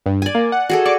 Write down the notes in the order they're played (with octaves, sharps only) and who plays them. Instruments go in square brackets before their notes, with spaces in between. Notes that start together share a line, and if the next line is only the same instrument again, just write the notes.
[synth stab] G2
[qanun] D5 G#5
[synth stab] A#3
F#5
[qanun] F#4 G#4 A4
[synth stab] D5 D6 [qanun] C#6